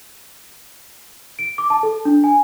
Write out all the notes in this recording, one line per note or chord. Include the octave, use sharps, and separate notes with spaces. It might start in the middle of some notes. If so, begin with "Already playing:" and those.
D7
D6
A5
A4
D4
G#5